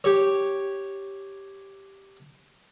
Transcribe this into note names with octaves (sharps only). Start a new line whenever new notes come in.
G4 C#5